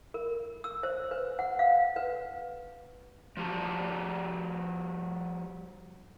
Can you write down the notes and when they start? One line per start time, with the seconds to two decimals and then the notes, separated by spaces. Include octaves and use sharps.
0.14 A#4
0.64 E6
0.83 C5
1.11 B4
1.39 F#5
1.59 F5
1.96 B4
3.37 F3 G3 F#4 G4 A5